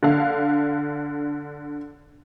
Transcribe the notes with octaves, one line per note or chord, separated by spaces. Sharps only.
D3 F5